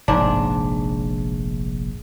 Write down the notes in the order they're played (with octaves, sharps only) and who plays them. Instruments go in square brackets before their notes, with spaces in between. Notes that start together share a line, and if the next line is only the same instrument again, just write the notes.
[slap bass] F1 A#1 [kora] G#2 D4